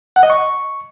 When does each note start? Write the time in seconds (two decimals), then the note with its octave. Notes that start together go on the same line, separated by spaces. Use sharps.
0.16 F#5
0.23 D#5
0.30 C#6